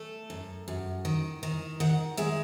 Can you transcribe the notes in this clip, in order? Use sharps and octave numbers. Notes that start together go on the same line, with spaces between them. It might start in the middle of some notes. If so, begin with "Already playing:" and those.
Already playing: A3 A4
F#2
F#2
D#3
D#3
D#3 F#5
G#3 E5